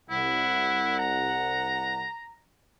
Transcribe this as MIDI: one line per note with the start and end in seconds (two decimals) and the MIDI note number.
0.10 2.04 36
0.10 0.96 64
0.10 2.04 78
0.99 2.38 82